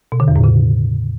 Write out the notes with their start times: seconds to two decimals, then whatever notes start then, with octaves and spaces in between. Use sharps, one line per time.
0.12 B2
0.20 D3
0.28 E2
0.36 A2
0.44 C#3